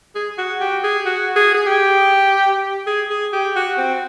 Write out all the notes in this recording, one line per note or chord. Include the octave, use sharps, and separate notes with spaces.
G#4
F#4
G4
G#4
F#4
G#4
G#4
G4
G#4
G#4
G4
F#4
C4